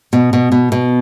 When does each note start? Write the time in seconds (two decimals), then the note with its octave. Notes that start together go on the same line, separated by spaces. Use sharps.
0.13 B2
0.33 B2
0.52 B2
0.72 B2